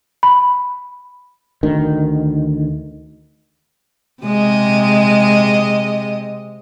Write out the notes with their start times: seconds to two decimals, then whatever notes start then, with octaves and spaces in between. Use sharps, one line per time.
0.23 B5
1.63 D2 D#3
4.23 C3 G#3 D#5